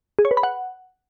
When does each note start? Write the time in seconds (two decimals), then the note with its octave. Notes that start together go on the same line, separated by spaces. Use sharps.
0.19 G#4
0.25 C#5
0.31 B4
0.37 B5
0.43 F#5